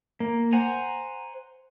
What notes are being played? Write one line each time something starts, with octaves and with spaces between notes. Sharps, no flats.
A#3
C5 F#5 G#5 A#5